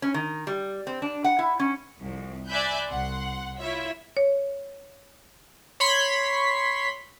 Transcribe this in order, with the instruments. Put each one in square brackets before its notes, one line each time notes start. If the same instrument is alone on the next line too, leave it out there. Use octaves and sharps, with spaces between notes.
[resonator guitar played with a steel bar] C#4
D#3
G3
C4
D4
F#5
E4
C#4
[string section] C2 F2
D5 E5 G#5 B5 F#6 G6
C2 F#5 C6
E4 F4 C#5 E5
[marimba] C#5
[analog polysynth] C#5 B5 C6 B6